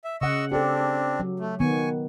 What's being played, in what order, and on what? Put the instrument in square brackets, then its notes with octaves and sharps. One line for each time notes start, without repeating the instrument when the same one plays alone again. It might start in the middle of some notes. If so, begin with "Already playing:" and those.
[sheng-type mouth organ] E5
[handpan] C#3 F#5 [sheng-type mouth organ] D#5 C#6 E6
[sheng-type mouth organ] C4 D4 [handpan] G4 A4
[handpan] F#3
[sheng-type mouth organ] A3
[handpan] D#3 B3 [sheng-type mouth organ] G#5 C#6